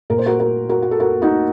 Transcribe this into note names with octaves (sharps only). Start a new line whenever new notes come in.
A#2 A#4
C5
F#4 A#4
F#4 A#4
F#4 A#4
F#4
A4
F#4 A#4
D#4 F#4